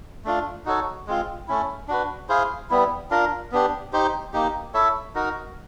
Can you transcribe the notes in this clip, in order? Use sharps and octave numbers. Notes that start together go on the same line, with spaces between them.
A3 D4 F4
D#4 F#4 A4 C#5
G#3 C4 F4
A3 C#4 E4
D4 F#4 B4
E4 G#4 C5 F5
G3 B3 E4
D4 F4 A#4
B3 D4 G4
D#4 G4 C5
A#3 D#4 G4
E4 A4 C#5 E5
D#4 F#4 A#4